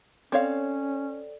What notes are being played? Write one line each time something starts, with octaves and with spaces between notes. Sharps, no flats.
C4 C#4 A4 C#5 D5 F5